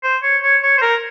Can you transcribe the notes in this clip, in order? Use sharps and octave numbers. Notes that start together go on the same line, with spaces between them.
C5
C#5
C#5
C#5
C5
A#4